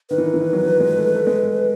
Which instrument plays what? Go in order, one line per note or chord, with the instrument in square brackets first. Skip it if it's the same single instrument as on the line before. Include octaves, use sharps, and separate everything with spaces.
[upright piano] D#3 [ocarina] B4
[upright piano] E3
D#3
E3
D#3
F#3
F3
G#3
A3
A3
G#3
A3